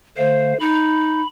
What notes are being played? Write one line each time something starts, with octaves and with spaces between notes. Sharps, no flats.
D3 A3 C5 F5
D#4 B5